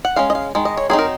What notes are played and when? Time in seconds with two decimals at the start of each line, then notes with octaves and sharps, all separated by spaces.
0.05 F#5
0.16 G#3 C#4 F5
0.30 D#5
0.35 F5
0.55 D#3 G#3
0.65 D#5
0.77 C#5
0.90 F#3 C4 D#4 G#4
0.99 A#4